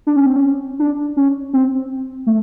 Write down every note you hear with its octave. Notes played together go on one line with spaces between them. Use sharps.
D4
C#4
C4
C#4
D4
C#4
C4
A3